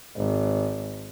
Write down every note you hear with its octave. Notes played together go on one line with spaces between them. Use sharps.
G#1